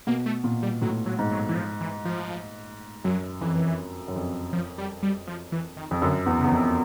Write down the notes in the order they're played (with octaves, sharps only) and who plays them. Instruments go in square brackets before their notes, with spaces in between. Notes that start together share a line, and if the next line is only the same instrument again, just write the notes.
[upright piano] B2 [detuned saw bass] A#3
[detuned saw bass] A3
[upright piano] A#2
[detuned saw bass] G3
[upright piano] A2 [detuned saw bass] F#3
[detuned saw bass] F#3
[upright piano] G#2
[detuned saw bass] F#3
E3
F3
E3
F3
[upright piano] F#2 [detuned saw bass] F#3
[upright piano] F2 [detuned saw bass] E3
[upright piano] F#2
F2
[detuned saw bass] F3
G3
G3
F3
E3
D#3
[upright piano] F2
[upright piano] F#2 [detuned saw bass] D3
[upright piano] E2
[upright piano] E2 [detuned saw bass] C#3
[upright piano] F2